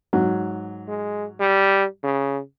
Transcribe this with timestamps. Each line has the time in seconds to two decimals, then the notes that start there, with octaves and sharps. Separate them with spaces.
0.13 G#2 F#3
0.88 G#3
1.39 G3
2.04 C#3